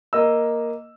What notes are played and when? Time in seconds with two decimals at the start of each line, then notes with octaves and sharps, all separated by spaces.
0.13 A#3 D#5 E6